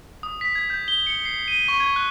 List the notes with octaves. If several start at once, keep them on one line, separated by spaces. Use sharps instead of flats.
D#6
B6
G#6
G6
G7
C#7
C7
D#7
C#6
G#6
F#6